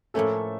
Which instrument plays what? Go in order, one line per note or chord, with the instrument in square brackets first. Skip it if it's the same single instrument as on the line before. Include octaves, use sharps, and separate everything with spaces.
[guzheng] A2 F3 A#3 C#4 [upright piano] A3 A4